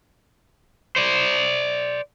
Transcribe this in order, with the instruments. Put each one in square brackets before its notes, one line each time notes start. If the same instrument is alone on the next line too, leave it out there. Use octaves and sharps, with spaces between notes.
[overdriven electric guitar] C5 D5